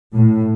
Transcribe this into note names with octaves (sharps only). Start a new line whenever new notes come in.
A2